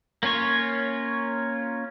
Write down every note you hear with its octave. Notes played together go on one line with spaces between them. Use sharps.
A#3 C#4 F4 C#5